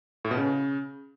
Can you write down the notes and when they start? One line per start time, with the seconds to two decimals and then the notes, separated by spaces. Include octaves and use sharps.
0.25 A2
0.31 B2
0.37 C#3